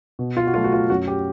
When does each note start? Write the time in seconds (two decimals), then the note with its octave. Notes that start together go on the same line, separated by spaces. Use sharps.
0.19 B2
0.37 F4
0.47 F#4
0.54 F#3 A3 F4
0.64 F#4
0.73 F4
0.90 F#2 F#4
1.08 G4